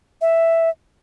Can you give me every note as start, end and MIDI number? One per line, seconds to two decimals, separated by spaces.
0.21 0.70 76